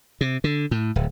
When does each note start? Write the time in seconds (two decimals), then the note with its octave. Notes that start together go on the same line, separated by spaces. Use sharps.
0.21 C3
0.44 D3
0.71 A2
0.96 D1